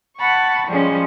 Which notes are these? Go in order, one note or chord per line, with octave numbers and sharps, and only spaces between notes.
F#5 A5 B5 C#6
F3 G3 G#3 C#4